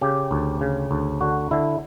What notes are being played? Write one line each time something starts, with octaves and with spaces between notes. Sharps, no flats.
C#3 G4
D2
C#3
D2
D3 F#4
D3 E4